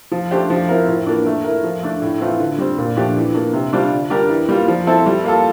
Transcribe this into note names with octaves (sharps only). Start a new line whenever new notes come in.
F3
A3 D4 G4 C5
F3
C4 E4 A#4
A2
E3 A#3 D4
A3
E4 A#4
F3
A3 D4
A2
E3 A3 C4 F4
D3
G3 C4
A#2
F3 A3 D4 G4
E3
A#3 D4
C3
G3 D4 F4 C5
D3
G3 D4 G4 A#4
E3
G3 A#3 F4
F3
C4 E4 A4
G3
A#3 F4 A4